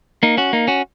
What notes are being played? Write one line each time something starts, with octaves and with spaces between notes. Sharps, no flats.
A#3 D#4
C#4 F#4
A#3 D#4
C#4 F#4